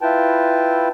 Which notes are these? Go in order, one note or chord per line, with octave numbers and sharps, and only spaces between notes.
E4 F4 B4 G5 A5